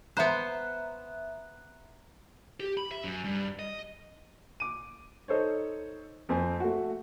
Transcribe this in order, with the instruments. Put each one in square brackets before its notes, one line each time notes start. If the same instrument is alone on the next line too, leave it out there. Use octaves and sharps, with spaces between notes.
[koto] B3 C5 [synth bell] E5 A#5 F#6
[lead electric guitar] G4
B5
E5
F#2
G2
D#5
[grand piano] D6 D#7
D#4 A4 C5 C#5
F2 C4 G#5
A3 F#4